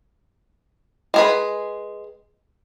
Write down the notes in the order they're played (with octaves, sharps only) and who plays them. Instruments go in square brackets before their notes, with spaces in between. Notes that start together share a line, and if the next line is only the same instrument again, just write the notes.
[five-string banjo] G#3 G#4 B4